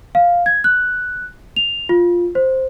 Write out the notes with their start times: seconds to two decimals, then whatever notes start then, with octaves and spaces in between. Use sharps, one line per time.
0.15 F5
0.46 G#6
0.64 F#6
1.56 F7
1.89 F4
2.35 C5